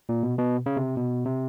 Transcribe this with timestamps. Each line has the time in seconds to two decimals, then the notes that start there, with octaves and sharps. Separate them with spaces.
0.09 A#2
0.23 B2
0.38 B2
0.66 C#3
0.77 C3
0.97 B2
1.25 C3